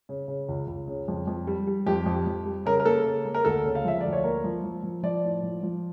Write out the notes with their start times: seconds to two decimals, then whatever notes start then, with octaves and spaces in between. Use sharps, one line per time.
0.09 C#3
0.28 C#3
0.48 C#2
0.68 C#2
0.88 C#3
1.08 F2
1.27 F2
1.47 G3
1.67 G3
1.87 F2 G4
2.06 F2
2.26 F2
2.46 G3
2.66 C#3 A#4
2.80 A#4
2.85 A#3 A4
3.06 C#3
3.25 A#3
3.34 A#4
3.45 D2 A4
3.65 C#3
3.75 F5
3.85 F3 E5
4.01 D2 D5
4.13 C#5
4.24 A#3 A#4
4.44 F3
4.64 F3
4.83 F3
5.03 F3 D5
5.24 A2
5.43 F3
5.63 F3